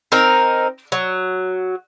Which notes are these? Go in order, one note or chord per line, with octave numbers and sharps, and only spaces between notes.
C4 D#4 A#4
F#3